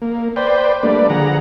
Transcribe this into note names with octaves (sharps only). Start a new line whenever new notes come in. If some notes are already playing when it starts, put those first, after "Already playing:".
A#3
B4 C5 D5 G5
G3 A3 A#3 D4 B4 D5
D3 F3 G#4 F#5 A#5